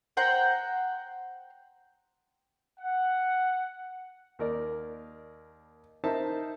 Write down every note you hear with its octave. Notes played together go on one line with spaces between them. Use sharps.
C5 F#5 G5 A#5
F#5
D#2 A#4 D5
D#4 A#4 C5 E5 A5